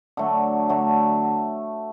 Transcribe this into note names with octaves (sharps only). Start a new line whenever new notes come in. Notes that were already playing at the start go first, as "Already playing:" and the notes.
D3 F#3 A3
D3 F#3 A3